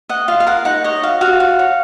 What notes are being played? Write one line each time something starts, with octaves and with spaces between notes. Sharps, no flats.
D#5 F#5
F4 F5
F5
A#4 F#5
D#4 F#5
C#5 D#5
F#4 F5
F#4 F5
F#4
C#5